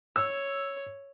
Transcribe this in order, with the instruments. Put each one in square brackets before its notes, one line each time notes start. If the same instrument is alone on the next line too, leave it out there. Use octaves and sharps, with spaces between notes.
[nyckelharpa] C#5 [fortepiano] E6